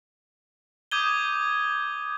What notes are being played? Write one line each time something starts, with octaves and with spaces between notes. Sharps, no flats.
D6 D#6 G6 G#6 D#7 G7